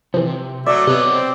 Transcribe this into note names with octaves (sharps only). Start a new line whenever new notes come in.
C3 E3 F3
F#3 A3 D5 E5
C3 B3 A4 C#5 D#5
C4